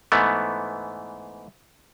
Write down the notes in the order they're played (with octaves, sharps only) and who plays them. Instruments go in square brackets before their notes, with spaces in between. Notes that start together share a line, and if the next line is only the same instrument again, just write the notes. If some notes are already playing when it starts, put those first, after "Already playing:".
[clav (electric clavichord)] G#2 E3 A3 B3